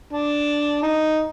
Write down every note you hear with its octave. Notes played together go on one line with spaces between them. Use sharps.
D4
D#4